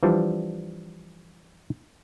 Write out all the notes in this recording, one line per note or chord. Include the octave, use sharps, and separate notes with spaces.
E3 F3 G3 D4